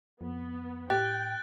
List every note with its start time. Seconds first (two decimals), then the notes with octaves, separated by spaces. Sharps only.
0.21 F2 B3
0.90 A2 G4 G5 F#6 A6